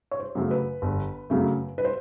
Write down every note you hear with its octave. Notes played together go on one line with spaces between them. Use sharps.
C#5
C5
F#2 C#3 F#3 A3
B4
G1
F#2 C#3 F#3 A3
B4
C5